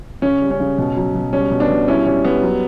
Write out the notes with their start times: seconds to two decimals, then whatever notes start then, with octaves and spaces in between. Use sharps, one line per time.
0.22 C#3 C#4
0.42 G3
0.51 C#4
0.60 C#3
0.78 B2
0.96 F#3
1.15 B2
1.32 G3 C#4
1.51 B2
1.60 B3 D4
1.69 B2
1.88 G3 C#4 E4
2.06 G3 C#4
2.24 G3 B3
2.42 F#3